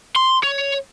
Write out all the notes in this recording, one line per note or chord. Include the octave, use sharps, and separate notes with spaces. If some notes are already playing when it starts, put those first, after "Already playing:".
C6
C#5